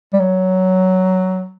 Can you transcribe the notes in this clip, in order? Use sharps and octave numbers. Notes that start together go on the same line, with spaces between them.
G3
F#3